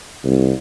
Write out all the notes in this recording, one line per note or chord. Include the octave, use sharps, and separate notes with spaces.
C2